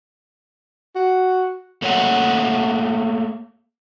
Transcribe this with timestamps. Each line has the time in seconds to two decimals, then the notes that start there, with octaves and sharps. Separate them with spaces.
0.96 F#4
1.82 A3 A#3 C#5 E5 F#5